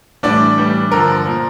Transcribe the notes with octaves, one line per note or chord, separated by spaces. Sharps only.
A2 E3 G3 D4 D5
A2 E3 G3
G2 D3 F3 A#4
A#2 F3